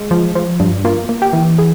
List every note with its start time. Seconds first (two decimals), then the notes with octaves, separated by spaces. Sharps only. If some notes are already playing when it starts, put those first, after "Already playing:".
Already playing: G#3
0.11 F3
0.35 F3
0.60 G2
0.85 A#3 F4
1.09 A#3
1.22 G4
1.33 E3
1.58 G#4